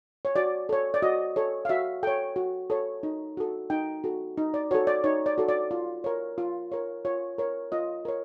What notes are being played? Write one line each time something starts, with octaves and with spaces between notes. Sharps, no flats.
C#5
F#4 D5
A4 C#5
D5
F#4 D#5
A4 C#5
F5
F#4 E5
A4 C#5 G5
F#4
A4 C#5
D#4
F#4 A4
D#4 G5
F#4 A4
D#4
D5
F#4 A4 C#5
D5
D#4 C#5
D5
F#4 A4
D5
F4
A#4 C#5
F4
A#4 C#5
F4 C#5
A#4 C#5
F4 D#5
A#4 C#5